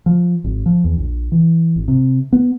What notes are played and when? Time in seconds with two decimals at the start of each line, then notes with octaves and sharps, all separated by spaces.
0.06 F3
0.44 G#1
0.66 F3
0.84 E2
0.97 A#1
1.32 E3
1.76 G#1
1.88 C3
2.33 B3